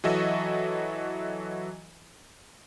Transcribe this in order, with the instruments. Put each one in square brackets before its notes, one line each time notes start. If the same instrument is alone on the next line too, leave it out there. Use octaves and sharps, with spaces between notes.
[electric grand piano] E3 F#3 F#4 A4 D#5 E5